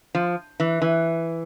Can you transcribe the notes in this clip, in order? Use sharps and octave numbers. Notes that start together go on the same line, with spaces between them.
F3
E3
E3